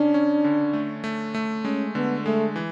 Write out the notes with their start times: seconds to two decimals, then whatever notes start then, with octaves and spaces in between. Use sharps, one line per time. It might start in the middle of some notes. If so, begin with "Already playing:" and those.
Already playing: C#3 C#4 D4
0.14 C#4
0.44 D3
0.73 A3
1.04 A3
1.35 A3
1.64 G#3 C#4
1.95 D3 B3
2.25 G#3 A3
2.56 E3